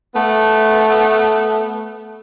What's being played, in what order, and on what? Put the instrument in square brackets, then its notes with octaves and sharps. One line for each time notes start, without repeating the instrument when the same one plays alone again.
[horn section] A3 B3